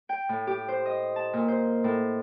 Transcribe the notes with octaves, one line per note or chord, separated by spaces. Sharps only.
G5
A2
G4
C5
D#5
A5
A#2
C5
A2